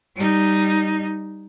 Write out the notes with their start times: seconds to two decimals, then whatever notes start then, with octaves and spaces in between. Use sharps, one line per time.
0.16 G3 D#4